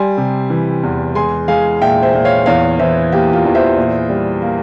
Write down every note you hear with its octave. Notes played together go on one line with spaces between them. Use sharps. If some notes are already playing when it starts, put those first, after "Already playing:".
Already playing: G3 G#5 C6
C3
E3
E2
G#3 G#5 C6
G#3 F5 G#5
A#2 E5 G5
C5 E5
A#2
C#5 F5
E2 C#5 F5
E3 C5 E5
A#3 G4
F4
E2
C5 E5
A#2
G3
A#3